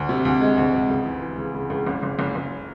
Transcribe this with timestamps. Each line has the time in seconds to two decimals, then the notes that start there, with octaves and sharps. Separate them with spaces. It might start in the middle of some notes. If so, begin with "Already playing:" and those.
Already playing: D2
0.09 C3
0.25 D2
0.41 G#3
0.57 D2
0.74 D2
0.90 C#2
1.05 E3
1.22 E3
1.38 C#3
1.54 C#3
1.70 C#2
1.86 F#1
2.03 F#1
2.19 F#1
2.35 F#1